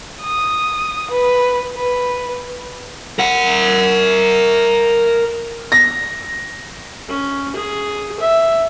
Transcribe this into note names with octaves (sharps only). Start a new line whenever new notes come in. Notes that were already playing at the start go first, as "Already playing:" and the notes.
D#6
B4
B4
A#4 F#5
A#6
C#4
G#4
E5